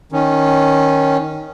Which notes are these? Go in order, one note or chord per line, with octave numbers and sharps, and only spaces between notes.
D#3 C#4